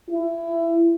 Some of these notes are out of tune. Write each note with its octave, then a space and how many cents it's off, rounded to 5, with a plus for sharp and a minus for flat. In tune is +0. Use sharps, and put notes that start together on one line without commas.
E4 +20